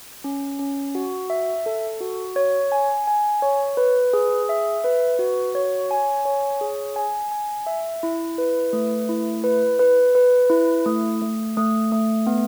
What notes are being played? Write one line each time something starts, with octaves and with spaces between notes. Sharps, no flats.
C#4
C#4
F#4
E5
A4
F#4
C#5
G#5
G#5
C#5
B4
G#4
E5
B4
F#4
C#5
G#5
C#5
G#4
G#5
G#5
E5
E4
B4
A3
E4
B4
B4
B4
E4
A3
A3
A3
A3
B3